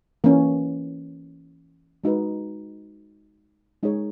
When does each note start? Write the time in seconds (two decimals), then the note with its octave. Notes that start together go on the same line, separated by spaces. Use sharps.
0.24 E3 A#3 C#4
2.04 G#3 D#4 F#4 B4
3.83 G#3 D#4 G#4 C#5